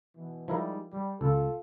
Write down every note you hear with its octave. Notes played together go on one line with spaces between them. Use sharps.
B2 E3
F3 G3 G#3 D#4 E4 A#4
G3
C#2 F4 A4